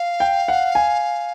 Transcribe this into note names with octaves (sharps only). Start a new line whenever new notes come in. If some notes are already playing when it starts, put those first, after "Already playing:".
Already playing: F5
G5
F#5
G#5